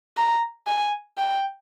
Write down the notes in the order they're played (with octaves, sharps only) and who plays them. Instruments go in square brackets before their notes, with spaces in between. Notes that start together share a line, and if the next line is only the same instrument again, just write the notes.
[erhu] A#5
G#5
G5